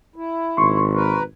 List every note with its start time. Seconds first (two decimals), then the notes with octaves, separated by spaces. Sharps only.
0.16 E4
0.57 G#1 C6 C#6
0.94 A#4 B4